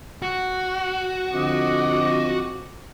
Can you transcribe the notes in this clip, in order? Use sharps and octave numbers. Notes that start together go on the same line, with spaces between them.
F#4
D3 F3 C4 D#5 D6